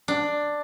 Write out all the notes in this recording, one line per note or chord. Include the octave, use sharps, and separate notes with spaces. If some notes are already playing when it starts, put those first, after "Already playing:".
D4